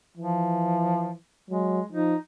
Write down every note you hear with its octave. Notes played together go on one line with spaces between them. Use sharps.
E3 F3
F#3 G#3
F3 D#4